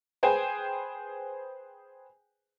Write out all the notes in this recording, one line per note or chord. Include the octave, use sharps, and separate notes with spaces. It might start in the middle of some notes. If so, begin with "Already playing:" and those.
G#4 B4 C5 G5 G#5